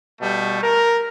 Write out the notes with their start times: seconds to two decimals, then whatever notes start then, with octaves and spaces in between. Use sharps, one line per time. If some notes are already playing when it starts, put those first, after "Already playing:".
0.21 B2 G3 A3
0.63 A#4